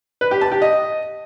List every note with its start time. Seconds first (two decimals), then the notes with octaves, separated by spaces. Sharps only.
0.21 B4
0.31 G4
0.41 A5
0.52 G4
0.62 D#5